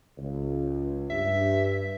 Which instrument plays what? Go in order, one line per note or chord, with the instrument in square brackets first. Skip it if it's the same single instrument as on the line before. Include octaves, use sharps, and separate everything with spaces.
[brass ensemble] C#2
[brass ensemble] G2 [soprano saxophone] E5